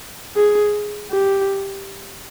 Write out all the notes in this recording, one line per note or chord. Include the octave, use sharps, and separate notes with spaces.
G#4
G4